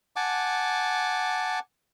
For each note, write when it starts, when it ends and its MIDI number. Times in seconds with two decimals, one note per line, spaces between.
0.16 1.59 78
0.16 1.59 80
0.16 1.59 81
0.16 1.59 86